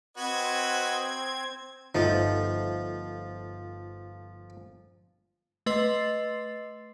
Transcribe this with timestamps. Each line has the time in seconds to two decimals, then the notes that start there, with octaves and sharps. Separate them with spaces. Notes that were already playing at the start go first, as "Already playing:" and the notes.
0.17 C4 F#4 B4 D#5 G#6
1.95 G1 F3 A3 D#4
5.66 A3 B4 D#5 C6 A6 C7